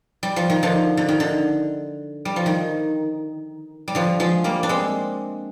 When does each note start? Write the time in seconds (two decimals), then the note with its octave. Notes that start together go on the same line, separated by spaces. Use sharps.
0.23 G3
0.36 F3
0.50 D#3
0.63 D3 F3
0.97 D3
1.08 D#3
1.20 D3
2.25 G3
2.36 F3
2.46 D#3
3.88 G3
3.95 D3 F3
4.20 F3 G#3
4.44 G3 A#3
4.63 D4
4.69 G#3 C4